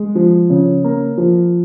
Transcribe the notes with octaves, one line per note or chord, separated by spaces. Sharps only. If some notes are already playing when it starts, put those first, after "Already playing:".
Already playing: G#3
F3
C#3
A#3
F3